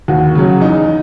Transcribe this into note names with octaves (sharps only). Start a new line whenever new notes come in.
D#2 F#4
C#3 F#3
E2 D#4